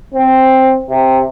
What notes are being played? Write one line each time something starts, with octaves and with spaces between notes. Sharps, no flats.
C4
C3